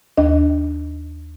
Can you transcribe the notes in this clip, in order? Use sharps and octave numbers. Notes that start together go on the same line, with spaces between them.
D#2 D4 D#5